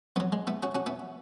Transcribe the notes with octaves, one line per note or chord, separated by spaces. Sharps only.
F#2 F#3 B3
G#3
B3 E4
C#4 F#4
C#4 F#4
B3 E4